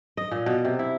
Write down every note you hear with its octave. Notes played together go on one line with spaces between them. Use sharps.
D#5
A#2
B2
C3
E4